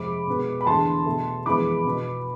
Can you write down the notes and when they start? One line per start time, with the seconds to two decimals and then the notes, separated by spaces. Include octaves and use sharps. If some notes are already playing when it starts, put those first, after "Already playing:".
Already playing: F2 C3 G#3 B5 D6
0.27 B2 G#3 B3
0.61 B5
0.66 E2 D3 A3 A5 C6
1.06 B2 A3
1.46 F2 E3 G#3 B3 B5 D6
1.85 B2 B3